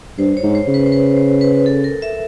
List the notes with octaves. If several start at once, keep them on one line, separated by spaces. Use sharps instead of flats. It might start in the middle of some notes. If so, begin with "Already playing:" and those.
G2 C5
C#5
G#2
C5
C#3
B4
C5
B4
C5
B4
A4
A#4
E5